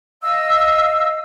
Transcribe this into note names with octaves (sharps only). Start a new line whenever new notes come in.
D#5 F5 E6